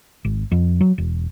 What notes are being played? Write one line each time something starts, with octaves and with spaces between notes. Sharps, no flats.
G#1
F2
F#3
E1